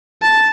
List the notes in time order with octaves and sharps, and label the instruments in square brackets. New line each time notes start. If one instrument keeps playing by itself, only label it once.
[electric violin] A5